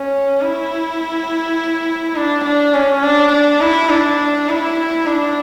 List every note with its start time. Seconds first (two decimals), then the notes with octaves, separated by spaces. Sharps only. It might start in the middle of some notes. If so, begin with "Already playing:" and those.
Already playing: C#4
0.42 E4
2.16 D4
2.45 D4
2.74 C#4
3.03 D4
3.32 D4
3.61 E4
3.90 D4
4.49 E4
5.07 D4